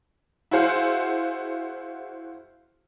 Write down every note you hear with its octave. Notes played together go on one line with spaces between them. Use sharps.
E4 F#4 G#4 C5 F5 F#5